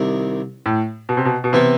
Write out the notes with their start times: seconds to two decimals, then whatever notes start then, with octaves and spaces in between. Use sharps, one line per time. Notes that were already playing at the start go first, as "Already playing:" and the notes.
Already playing: C2 C3 D#3
0.66 A2
1.09 B2
1.17 C3
1.25 B2
1.44 B2
1.53 C3 E3 B3 E4